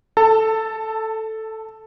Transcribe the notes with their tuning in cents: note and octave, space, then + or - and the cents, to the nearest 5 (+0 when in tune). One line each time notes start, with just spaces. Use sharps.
A4 +0 A5 +30